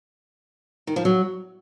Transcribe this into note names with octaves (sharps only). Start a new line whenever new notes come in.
D#3
F3
F#3